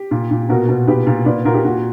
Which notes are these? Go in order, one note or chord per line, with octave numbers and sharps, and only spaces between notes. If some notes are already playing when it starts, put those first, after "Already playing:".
Already playing: G4
A#2
A#2
B2 F#4 A#4
B2
A#2 G4 B4
A#2
A#2 B4 D5
A#2 F#4 A#4
G4
A#2 F#4